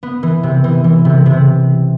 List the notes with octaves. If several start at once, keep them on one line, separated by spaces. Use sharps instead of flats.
B3
E3
C3
E3
E3
C3
C3